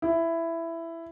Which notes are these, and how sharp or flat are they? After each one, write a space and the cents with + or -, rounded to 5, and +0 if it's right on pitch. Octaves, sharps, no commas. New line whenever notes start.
E4 +10